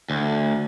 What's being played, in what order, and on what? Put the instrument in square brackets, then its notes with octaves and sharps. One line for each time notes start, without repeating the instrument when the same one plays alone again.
[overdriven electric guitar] D2